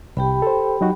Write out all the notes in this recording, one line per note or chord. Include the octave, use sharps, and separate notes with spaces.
C2 G4 G5 B5
A4 C5
F#3 D#4 F#4